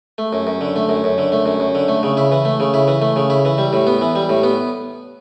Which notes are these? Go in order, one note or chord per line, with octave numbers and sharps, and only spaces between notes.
A3
F#2
F#2
D3
A3
F#2
F#2
D3
A3
F#2
F#2
D3
A3
C#3
E4
E3
A3
C#3
E4
E3
A3
C#3
E4
E3
G3
A2
B3
E3
G3
A2
B3